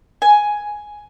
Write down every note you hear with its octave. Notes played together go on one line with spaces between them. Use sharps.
G#5